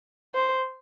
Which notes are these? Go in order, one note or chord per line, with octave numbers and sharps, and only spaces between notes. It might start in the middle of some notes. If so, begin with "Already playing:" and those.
C5